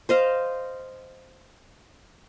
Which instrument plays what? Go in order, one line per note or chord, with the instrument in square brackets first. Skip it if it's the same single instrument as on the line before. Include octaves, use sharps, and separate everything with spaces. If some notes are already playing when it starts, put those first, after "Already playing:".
[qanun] C5 D#5 F5